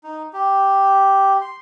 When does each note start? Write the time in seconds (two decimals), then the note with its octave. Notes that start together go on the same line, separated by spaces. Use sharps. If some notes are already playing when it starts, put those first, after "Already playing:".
0.04 D#4
0.33 G4
1.41 C6